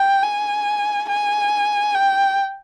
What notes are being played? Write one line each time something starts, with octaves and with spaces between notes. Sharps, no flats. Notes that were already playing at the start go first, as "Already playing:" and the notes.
Already playing: G5
G#5
G#5
G5